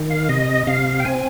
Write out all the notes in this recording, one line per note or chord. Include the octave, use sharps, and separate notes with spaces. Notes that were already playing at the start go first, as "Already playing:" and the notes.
Already playing: D#3
F5
C3 D#5
C3 F5
G5
C4 G#5